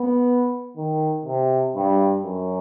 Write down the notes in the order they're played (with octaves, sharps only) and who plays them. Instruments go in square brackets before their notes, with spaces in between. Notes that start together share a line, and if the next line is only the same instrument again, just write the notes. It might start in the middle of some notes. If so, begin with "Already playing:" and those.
Already playing: [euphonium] B3
D#3
C3
G2
F#2